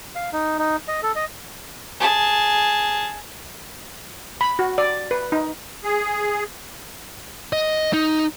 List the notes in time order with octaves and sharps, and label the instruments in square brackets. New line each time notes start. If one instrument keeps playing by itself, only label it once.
[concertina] F5
D#4
D#4
D#5
A4
D#5
[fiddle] G#4 A5
[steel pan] B5
F#4
D5
B4
D#4
[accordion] G#4
[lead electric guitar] D#5
D#4